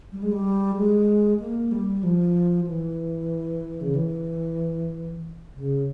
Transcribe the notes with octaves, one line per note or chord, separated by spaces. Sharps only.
G3
G#3
G3
G#3
A#3
G3
F3
E3
C#3
E3
C#3